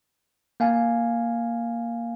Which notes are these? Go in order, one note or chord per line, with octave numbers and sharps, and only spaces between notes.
A#3 F5 G#5